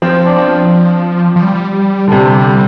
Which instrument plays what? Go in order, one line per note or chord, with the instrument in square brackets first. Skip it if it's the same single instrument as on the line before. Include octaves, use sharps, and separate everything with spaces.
[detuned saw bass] F3 [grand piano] C4
[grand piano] D4
C4
[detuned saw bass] F3
G3
[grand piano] D3
C3